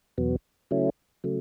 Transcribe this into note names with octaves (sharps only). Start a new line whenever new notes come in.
E2 B2 F#3 B3
C#3 F#3 A3 C#4 E4
C#3 F#3 A3